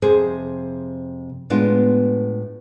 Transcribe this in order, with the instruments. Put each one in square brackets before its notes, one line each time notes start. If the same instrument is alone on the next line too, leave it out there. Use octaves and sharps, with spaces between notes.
[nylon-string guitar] F2 C3 G#4 C5
A2 G#3 B3 D4 F4